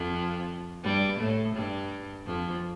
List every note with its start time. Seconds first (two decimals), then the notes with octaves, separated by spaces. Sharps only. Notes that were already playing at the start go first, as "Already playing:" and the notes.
Already playing: F2 F3
0.84 G2 G3
1.19 A2 A3
1.55 G2 G3
2.27 F2 F3